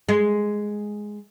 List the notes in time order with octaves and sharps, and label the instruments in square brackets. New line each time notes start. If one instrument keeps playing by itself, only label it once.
[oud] G#3